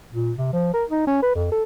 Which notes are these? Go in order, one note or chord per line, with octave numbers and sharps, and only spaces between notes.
A#2
C3
F3
A#4
D#4
C#4
B4
F2
A4